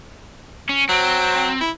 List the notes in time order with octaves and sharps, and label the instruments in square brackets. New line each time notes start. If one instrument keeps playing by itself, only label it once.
[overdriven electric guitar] C#4
[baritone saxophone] F#3 [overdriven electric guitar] C4
[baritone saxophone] E4